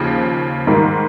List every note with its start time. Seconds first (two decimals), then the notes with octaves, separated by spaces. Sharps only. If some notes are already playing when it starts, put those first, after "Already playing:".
Already playing: D#2 C#3 F3
0.67 G#2 D#3 G3 A#3